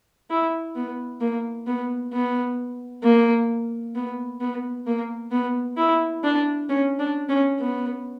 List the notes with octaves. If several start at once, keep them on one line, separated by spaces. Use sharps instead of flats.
E4
B3
A#3
B3
B3
A#3
B3
B3
A#3
B3
E4
D4
C#4
D4
C#4
B3